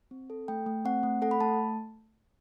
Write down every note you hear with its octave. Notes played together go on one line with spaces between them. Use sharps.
C4
A4
A3 G5
A3
C4 F#5
A3
A4 F#5
B5
A3 A5